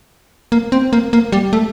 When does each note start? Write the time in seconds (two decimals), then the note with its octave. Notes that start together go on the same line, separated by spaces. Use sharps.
0.52 A#3
0.72 C4
0.93 A#3
1.13 A#3
1.32 G3
1.53 A3